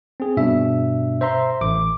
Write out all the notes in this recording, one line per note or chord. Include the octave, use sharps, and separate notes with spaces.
C4 G#4
G2 B2 D4 E5
C5 E5 A#5 C6
A1 D6